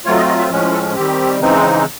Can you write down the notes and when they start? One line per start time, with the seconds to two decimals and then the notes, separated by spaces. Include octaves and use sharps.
0.05 F#3 A3 C4 F4 C#5
0.16 D#5
0.28 D#5
0.39 E5
0.50 A2 F3 G#3 C#4
0.72 A4
0.95 D#3 G3 C4 G4
1.40 C#3 E3 G#3 C4 D#4